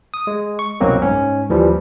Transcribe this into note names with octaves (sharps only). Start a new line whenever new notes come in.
D#6
G#3
C#6
C2 F#2 B2 F#3 A#3 C4
G#2 C#4
D#2 E3 F3 G3